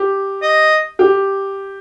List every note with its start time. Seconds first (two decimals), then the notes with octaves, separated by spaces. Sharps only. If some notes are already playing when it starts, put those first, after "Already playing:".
Already playing: G4
0.42 D#5
0.99 G4